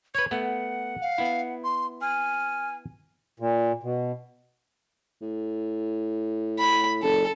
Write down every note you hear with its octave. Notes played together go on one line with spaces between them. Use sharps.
B4 C#5 G#6
A3 B3 F#5
F5
B3 E4
C6
G#5 F6
A#2
B2
A2
B5
F#1 A4